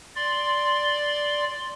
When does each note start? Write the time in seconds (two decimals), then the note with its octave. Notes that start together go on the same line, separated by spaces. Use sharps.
0.16 D5 C6